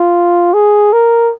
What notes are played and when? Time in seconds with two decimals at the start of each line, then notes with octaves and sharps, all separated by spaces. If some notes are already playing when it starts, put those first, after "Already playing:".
Already playing: F4
0.54 G#4
0.93 A#4